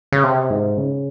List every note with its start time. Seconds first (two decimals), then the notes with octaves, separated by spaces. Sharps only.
0.12 C#3
0.23 C3
0.50 G#2
0.77 C#3